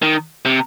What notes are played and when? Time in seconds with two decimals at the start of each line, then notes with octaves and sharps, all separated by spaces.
0.02 D#3
0.45 C3